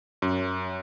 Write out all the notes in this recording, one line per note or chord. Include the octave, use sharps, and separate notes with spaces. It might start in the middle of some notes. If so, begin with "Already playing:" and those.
F#2